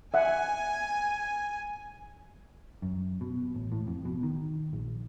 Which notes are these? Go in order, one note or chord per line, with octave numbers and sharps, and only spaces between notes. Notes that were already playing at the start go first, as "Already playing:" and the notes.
E5 F#5 G#5
F#2
B2
A1
A2
F2
B2
D#3
A#1